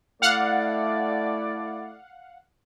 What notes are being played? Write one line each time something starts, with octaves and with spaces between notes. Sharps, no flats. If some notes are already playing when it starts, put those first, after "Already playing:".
A3 E4 D5 F5 F#5